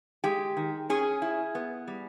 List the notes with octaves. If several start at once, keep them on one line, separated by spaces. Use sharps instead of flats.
G#3 G4
D#3
C#4 G#4
E4
B3
G3